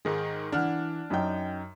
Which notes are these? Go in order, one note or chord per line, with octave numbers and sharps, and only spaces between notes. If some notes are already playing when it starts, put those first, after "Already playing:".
G#2 D#3 G#3 G#4
E3 D4 F#5 F6
F#2 D#4 G5